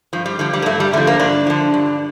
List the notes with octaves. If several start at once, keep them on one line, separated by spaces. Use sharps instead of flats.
G2 F3
G3
D3 F3 G3
G3
A#3
G2 A3
G3
D3 F3 A3
A#3
G2 D4
D3 F3
G2